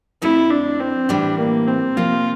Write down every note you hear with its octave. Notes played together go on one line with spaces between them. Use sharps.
F2 D3 A3 E4
D4
C4
A2 E3 G3 D4
A#3
C4
C3 F3 A#3 F4